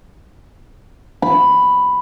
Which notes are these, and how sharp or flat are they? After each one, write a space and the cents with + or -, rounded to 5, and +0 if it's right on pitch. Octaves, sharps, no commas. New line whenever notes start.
B5 +5